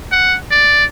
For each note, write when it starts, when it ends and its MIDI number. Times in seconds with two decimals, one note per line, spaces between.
0.12 0.37 78
0.51 0.85 74